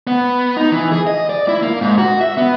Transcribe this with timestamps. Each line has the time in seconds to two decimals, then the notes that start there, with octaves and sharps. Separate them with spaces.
0.07 B3
0.57 D#4
0.72 E3
0.92 G#4
1.07 D#5
1.29 D5
1.48 E4
1.63 A#3
1.81 G#2
1.98 F#4
2.21 E5
2.37 B3